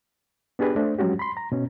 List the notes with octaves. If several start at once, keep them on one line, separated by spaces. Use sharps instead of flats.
B3 D4 G4 G#4 B4
A3 D4 C5
F3 F#3 G#3 C#4 F#4 G4
B5 C6
A#5
B2 C#4